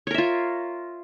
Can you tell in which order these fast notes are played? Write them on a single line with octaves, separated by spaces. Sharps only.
C#5 A#4 E5 F4